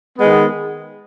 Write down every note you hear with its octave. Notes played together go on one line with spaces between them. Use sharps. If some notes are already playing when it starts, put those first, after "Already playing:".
D#3 G#3 B3